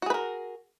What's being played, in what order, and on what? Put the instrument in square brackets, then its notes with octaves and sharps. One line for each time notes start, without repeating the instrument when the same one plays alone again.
[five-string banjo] F#4
G#4
B4
A#4